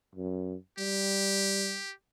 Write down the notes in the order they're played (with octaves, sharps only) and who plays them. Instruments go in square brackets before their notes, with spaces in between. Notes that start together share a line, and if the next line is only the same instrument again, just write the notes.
[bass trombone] F#2
[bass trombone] G3 [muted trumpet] G4